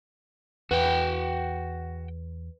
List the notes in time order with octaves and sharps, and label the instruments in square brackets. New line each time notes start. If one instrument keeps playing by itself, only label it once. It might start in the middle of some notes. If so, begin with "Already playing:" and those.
[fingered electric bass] E2 [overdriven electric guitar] F#4 G5 [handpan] B4